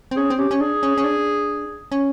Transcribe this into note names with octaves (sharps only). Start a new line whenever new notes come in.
C4
C#4 G#4
C4
C#4 G4
C#4
D4 G#4
C#4
C#4
D4
C#4